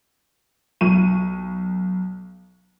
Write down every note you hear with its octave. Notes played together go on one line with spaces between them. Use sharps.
B1 C#6 D#7